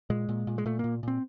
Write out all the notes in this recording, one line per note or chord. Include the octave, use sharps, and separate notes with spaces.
A#2 G#3
A#2
A#2
G#3
A#2 A3
A#2 A#3
A#2 C4